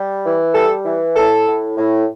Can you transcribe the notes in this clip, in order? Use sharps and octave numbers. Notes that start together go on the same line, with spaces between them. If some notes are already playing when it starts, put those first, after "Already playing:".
Already playing: G3
E3
G3 A4
E3
A2 A4
A2
A2